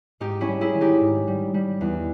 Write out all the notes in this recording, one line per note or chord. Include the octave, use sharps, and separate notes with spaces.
G#2 D#4 G4
C#4 E4
G3
E4 G#4
D#3
D#4 G4
G#2
G3
G3
E2